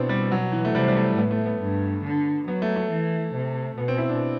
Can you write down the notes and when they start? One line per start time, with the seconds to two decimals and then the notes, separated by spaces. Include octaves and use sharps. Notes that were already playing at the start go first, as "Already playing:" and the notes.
Already playing: B2 B3 C4 D4 E4
0.09 G3
0.32 F#3
0.52 E3
0.65 A3
0.74 C3 G3
0.88 G3
0.96 A3
1.18 A2 B3
1.31 A3
1.46 B3
1.61 G2
2.04 D3
2.47 F#3 B3
2.62 A3
2.76 A3
2.91 E3
3.34 C3
3.77 B2 B3
3.88 C4
3.98 E4
4.09 D4